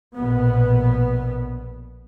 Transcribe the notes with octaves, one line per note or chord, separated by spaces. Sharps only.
A#1 B2 B3